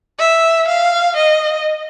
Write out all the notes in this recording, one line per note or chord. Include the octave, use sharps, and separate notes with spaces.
E5
F5
D#5